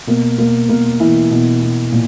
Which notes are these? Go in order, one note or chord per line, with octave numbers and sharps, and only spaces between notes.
B2 A#3
B2 A#3
B2 A#3
B2 E3 E4
B2
B2
A#2